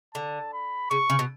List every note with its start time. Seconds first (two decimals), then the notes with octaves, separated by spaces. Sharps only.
0.14 D3 A5
0.53 B5
0.91 C#3 C#6
1.10 C#3
1.19 B2